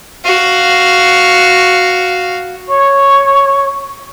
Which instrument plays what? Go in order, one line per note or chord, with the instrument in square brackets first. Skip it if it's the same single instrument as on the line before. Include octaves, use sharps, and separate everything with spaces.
[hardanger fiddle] F#4 F5
[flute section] C#5 C#6